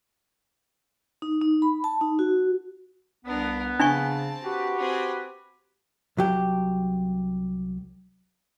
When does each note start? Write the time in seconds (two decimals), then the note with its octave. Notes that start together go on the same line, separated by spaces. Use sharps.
1.22 D#4
1.42 D#4
1.62 B5
1.84 A5
2.01 D#4
2.19 F#4
3.26 C2 B3 D4 A#4
3.80 C#3 C4 D4 G#5 A5 C#6
4.44 F#4 G4 B4
4.76 C4 G#4
6.17 C2 F#3 G4